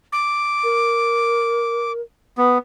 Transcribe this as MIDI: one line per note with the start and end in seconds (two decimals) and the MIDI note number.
0.12 1.92 86
0.64 2.01 70
2.38 2.58 59